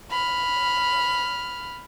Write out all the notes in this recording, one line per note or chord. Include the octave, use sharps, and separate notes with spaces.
B5 F6